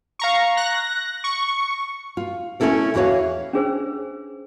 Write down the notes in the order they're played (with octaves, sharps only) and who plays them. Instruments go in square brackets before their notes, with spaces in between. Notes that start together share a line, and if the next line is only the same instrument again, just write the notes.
[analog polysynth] F5 A#5 C#6
F#6 A#6
C#6
[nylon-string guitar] F4
A3 C#4 D#4 E4 A4 A#4
E2 E3 F#4 G#4 C#5 F5
[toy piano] C#4 D4 G#4 B4 C5